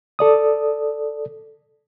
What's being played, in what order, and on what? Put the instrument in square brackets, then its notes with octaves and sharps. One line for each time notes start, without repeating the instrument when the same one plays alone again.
[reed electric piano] A4 D5 D#6